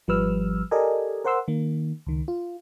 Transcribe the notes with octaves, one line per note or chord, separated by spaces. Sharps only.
G#1 F3 G3 B4 E6 F6
G4 A4 A#4 D5 D#5 G#5
A#4 C5 F#5 C6 E6
D#3 A#3
C#2 D#3
F4